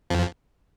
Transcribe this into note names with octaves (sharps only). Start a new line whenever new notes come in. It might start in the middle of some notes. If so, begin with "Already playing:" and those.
F2 F3